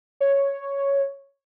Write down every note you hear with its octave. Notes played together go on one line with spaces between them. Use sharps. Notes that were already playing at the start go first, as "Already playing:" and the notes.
C#5